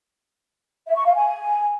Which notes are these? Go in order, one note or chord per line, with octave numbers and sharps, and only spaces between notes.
E5
C#6
F5
G#5